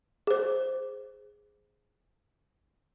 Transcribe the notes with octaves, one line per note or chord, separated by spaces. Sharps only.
G#4 C5